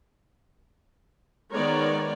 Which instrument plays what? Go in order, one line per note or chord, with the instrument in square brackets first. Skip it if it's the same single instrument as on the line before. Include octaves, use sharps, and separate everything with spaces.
[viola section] D#3 G#3 B3 A#4 C#5 D5